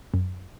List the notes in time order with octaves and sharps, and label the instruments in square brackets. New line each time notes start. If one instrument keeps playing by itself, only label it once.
[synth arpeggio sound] F#2